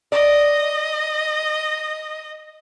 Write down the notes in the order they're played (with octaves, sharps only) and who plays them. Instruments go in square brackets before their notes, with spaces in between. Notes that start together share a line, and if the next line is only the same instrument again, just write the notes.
[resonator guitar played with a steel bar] D5 [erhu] D#5